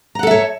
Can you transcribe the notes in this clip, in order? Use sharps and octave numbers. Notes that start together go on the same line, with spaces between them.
A4 C#5 E5 F#5 A#5